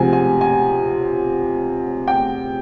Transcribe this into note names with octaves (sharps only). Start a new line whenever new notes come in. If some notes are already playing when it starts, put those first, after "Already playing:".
Already playing: C3 F3 G#3 G#5
G#5
G#5
G5